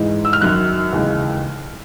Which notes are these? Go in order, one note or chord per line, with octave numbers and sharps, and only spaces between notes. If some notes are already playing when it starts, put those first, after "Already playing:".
Already playing: G#2 E3 G#3
E6
F6
F#2 D#3 F#3 F#6
D#2 C#3 E3 G#3